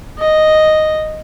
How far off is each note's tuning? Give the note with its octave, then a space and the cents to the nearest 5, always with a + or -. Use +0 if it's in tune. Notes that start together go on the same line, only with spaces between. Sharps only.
D#5 -5